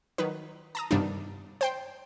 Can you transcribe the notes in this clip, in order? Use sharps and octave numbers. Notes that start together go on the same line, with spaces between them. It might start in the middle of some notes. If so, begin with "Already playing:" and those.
D#3 F#3 D#4 B4
A5 A#5 D#6
G2 C3 D#3 G3 B3 D4
C5 G5 C6